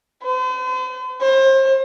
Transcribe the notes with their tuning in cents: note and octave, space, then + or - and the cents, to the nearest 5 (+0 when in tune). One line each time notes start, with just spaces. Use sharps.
C5 -45
C5 +35